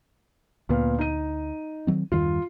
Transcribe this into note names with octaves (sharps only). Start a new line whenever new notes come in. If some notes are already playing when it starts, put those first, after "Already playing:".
D2 A#2 B3 F5
D#4 D#7
D#3 F#3 C4
E2 G2 D#3 F4